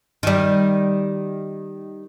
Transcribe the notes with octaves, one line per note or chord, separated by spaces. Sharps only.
D#3 G3